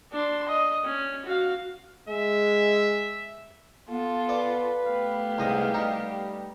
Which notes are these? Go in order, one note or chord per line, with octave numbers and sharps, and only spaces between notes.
D4 C6
D#5
C#4
F#4 F5
G#3 E5
B3 F4 A4
B4 D5
A3 B3 G4 F5
C2 G#2 D#5 D#6
G3 D#4